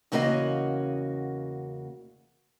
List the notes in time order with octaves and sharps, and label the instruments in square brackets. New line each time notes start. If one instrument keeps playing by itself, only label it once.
[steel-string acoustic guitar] E2 C#3 A#3 F#4 B4 D#5